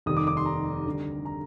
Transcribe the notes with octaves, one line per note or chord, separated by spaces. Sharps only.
F1 D#2 D#3 G3 D#6
D6
D6
C6
A#5
D2 D3 G3
A#5